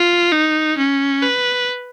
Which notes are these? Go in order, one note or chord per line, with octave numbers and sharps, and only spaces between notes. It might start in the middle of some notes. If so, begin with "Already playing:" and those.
Already playing: F4
D#4
C#4
B4